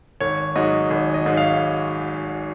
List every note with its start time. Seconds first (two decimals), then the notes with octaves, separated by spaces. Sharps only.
0.20 G#1 C#5
0.56 G#2 F#3 D#5
0.90 G#1
1.14 D#5
1.26 G#2 F#3
1.37 F5